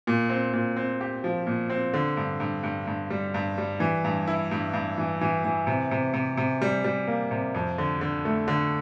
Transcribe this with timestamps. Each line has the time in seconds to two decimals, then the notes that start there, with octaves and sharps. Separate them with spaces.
0.07 A#2
0.29 C4
0.53 A#2
0.77 C4
1.01 G4
1.24 F3
1.47 A#2
1.70 C4
1.94 D3
2.17 G2
2.40 G2
2.63 G2
2.87 G2
3.10 G3
3.34 G2
3.58 G3
3.80 E3
4.04 G2
4.27 E4
4.51 G2
4.73 G2
4.98 E3
5.21 E3
5.45 E3
5.67 C3
5.91 C3
6.14 C3
6.37 C3
6.62 G3
6.84 G3
7.07 A#3
7.31 C3
7.54 F2
7.78 D3
8.01 D3
8.25 A3
8.48 D3